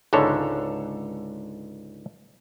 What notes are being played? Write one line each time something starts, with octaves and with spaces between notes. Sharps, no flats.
C#2 G#2 D3 A4 C#5